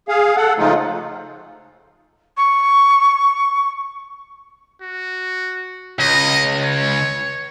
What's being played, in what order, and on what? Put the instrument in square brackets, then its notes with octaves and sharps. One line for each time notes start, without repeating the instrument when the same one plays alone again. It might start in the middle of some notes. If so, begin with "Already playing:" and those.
[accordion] G#4 F5
A4 F#5
C#3 F3 G#3 A3 D#4 F4
[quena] C#6
[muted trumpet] F#4
[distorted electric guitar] C#2 [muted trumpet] D#5
[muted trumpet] C#5